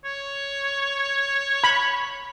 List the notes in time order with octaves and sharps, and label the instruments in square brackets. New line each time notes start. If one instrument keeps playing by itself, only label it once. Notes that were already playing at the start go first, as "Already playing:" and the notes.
[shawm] C#5
[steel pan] B5